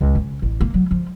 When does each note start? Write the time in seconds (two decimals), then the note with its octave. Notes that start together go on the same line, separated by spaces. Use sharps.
0.01 C#2
0.15 C#3
0.42 A1
0.61 A#3
0.74 F#3
0.91 F3